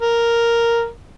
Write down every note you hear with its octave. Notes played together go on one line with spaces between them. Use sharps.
A#4